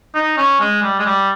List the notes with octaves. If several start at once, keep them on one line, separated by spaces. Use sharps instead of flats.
D#4
C#4
G#3
G3
G#3
G3